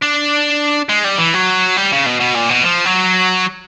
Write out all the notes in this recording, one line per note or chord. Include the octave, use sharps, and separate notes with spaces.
D4
G#3
G3
E3
F#3
G3
C#3
B2
B2
A#2
B2
F3
F#3